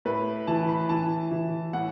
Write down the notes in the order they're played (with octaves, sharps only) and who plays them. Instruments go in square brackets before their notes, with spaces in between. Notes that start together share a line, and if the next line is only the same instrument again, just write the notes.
[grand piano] A2 B4
E3 A5
B5
E3 A5
E3
A2 F#5